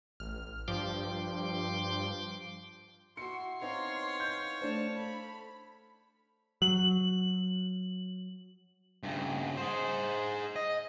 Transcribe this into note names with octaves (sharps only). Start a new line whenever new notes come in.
A1 F6
G2 F3 G5 C6 D6
E4 F#4 C6 C#7
B3 C4 D#4 C#5 F5 C6
G6
A3 D4 C5 A5
A4 B5
F#3 F#7
G2 C#3
G#4 C5
D#5